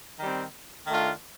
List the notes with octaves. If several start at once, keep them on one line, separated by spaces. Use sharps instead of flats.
D#3 G3 C4
D#3 A3 D4 F4